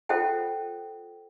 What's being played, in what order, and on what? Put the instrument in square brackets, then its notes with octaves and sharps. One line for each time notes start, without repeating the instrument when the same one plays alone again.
[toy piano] F4 A4 C5 E5 F#5 G5